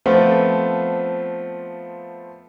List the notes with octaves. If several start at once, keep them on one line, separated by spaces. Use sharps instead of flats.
F3 A3 B3 C4 F4